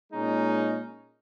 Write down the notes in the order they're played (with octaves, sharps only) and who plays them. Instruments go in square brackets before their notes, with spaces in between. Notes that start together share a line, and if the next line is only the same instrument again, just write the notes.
[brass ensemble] A#2 G#3 C#4 D#4